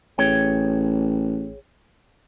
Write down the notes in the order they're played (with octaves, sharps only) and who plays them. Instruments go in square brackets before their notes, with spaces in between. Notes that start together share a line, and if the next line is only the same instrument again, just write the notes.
[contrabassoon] A1 [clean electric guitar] G#4 C#5 G5